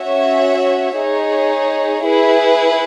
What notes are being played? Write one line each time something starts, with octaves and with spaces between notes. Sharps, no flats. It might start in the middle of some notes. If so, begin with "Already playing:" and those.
Already playing: C#4 F#4 C#5 E5
D#4 G#4 C#5
E4 G#4 B4